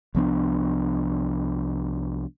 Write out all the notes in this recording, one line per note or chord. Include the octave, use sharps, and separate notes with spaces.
C2 F3 B3 D4